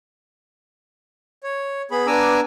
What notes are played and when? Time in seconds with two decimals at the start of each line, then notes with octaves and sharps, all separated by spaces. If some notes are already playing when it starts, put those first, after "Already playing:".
1.43 C#5
1.91 B3 G#4 B5
2.07 B3 D4 G#5 A#5 D6 E6